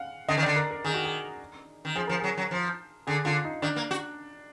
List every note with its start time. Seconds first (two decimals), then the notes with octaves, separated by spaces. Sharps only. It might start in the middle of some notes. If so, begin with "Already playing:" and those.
Already playing: F5 F#5
0.28 D3 D#5
0.37 D#3
0.43 D5
0.46 D3
0.56 A#4
0.71 A#4
0.84 D#3 G#4
0.94 F#4
1.04 G#4
1.85 D#3
1.95 F3 G#4
2.07 F3 A#4
2.20 F#3 G#4
2.37 F#3
2.51 F3
3.07 D3 G#4
3.25 D3 F4
3.44 D#4
3.62 D#3 D4
3.76 A#3
3.91 F#4